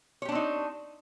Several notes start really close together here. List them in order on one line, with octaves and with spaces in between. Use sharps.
C#5 G4 D4 C4 D#4